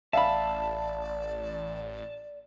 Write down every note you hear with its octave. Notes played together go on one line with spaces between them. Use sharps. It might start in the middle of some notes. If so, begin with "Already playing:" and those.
A1 D5 E5 F5 A5 B5